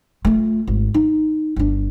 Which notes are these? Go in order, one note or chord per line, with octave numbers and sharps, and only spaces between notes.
A3 F4
G#1
D#4
G1 D4